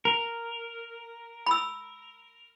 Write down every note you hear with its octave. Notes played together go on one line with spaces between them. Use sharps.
A#4
B5 E6